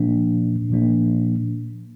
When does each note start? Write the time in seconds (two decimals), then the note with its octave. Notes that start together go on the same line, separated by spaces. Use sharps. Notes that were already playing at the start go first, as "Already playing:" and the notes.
Already playing: A#2 F3 A#3 D4
0.70 A#2 F3 A#3 D4